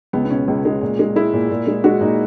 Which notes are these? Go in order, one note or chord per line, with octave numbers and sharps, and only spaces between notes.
C#2 B3
B3
B2 C#4
C#2
G#3
A#2
G#3
G#3 E4
A#2
A#2
G#3
G#3 F#4
A#2 D#4